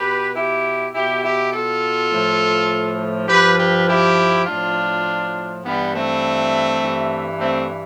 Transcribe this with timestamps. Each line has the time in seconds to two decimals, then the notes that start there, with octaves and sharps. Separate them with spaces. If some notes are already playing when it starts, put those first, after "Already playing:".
Already playing: B2 G4 B4
0.35 E4 G4
0.94 B2 E4 G4
1.23 E4 G4
1.52 F4 A4
2.11 A2 F3
3.28 G2 F3 G4 B4
3.58 G4 B4
3.87 E4 G4
4.46 A2 F3 D4 F4
5.63 G2 E3 G3 B3
5.92 A3 C4
6.81 G2 E3
7.39 A3 C4